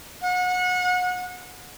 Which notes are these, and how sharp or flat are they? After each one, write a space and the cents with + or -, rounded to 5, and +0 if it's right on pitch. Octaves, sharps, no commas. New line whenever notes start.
F#5 -30